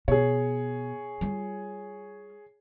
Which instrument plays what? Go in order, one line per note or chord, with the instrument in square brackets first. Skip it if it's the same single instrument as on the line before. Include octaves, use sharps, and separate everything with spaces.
[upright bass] B2 [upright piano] G#4 C#5
[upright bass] G3 F4